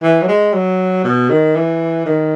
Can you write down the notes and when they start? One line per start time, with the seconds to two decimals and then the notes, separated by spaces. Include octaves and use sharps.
0.02 E3
0.22 F#3
0.28 G#3
0.53 F#3
1.04 B2
1.30 D#3
1.55 E3
2.06 D#3